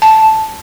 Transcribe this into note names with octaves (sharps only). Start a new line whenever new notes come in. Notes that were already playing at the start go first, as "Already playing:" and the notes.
A5